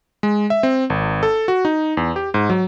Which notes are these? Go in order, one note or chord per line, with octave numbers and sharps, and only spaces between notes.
G#3
E5
C4
G#1
A4
F#4
D#4
E2
G4
G#2
F#3